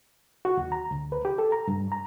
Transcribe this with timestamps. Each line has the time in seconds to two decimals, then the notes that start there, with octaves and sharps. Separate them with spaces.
0.45 F#4
0.57 D#2
0.72 A#5
0.91 D2
1.12 B4
1.25 G4
1.38 A4
1.52 A#5
1.68 G2
1.92 A#5